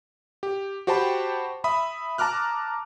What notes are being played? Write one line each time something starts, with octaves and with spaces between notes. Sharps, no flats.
G4
F#4 G4 C5 G5 A5 B5
E5 B5 D#6
A5 A#5 D6 F6 F#6